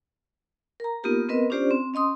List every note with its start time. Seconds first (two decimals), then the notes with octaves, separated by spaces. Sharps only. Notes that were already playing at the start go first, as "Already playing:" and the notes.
0.80 A#4 A#5
1.04 A#3 B3 D#4 F4 G4 A#4
1.29 B3 C4 A#4 B4 D#5
1.50 C#4 D4 F4 G4 C5 D5
1.71 C4
1.94 C#4 D#5 C6 D#6